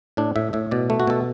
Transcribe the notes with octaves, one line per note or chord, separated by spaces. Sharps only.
A2 D4
A2 E5
A2 E5
B2 D5
A3
F#4
B2 A4